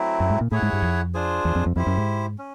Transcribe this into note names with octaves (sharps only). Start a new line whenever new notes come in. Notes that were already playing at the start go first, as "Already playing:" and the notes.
Already playing: F#3 A3 C4 E4
F#2
G#2
A#2
A2 E4 G#4 C#5 F#5
G#2
G2
F2
D4 F4 G#4 C5
E2
F2
F2
F2 E4 G4 C5
F#2
G#2
C#4